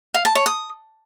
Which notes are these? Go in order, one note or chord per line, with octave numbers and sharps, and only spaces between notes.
F5
A5
C#5
D#6